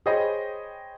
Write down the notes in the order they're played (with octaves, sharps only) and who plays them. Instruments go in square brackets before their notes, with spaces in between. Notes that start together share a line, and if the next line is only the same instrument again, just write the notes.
[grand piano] G#4 C5 C#5 D#5 G5 B5